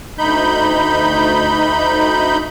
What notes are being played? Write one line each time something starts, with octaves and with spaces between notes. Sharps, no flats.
D2 D#4 B5 G6